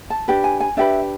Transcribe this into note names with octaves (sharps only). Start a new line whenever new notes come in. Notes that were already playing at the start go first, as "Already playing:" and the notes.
A5
D4 G4 B4
G#5
G#5
D4 G4 B4 E5